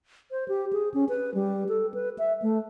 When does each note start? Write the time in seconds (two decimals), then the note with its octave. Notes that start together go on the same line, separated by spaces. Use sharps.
0.31 C5
0.48 G4
0.73 G#4
0.94 C#4
1.09 B4
1.34 G3
1.69 A4
1.94 B4
2.19 E5
2.42 A3